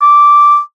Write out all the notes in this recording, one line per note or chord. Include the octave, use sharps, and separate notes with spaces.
D6